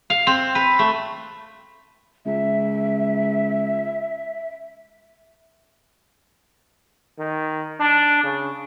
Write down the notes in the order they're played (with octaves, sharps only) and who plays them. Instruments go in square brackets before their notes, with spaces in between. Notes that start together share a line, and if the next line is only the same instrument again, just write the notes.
[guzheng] F5
C4
B4
A3
[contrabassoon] C#2 [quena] E5
[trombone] D#3
D4
C#3